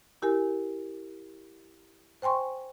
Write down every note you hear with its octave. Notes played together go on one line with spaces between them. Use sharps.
E4 G4 A#4 G#5
C5 G5 G#5 C6 C#6